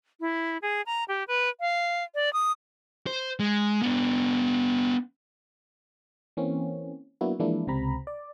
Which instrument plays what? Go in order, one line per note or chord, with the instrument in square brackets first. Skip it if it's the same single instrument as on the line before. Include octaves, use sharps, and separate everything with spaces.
[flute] E4
G#4
A#5
G4
B4
F5
D5
D#6
[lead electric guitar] C5
G#3
B3 D4
[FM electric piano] E3 A#3 C4 C#4
F#3 A#3 B3 D4 E4 F#4
E3 F3 G#3 A#3 D4 E4
C#2 C3 C4 A#5 B5
D5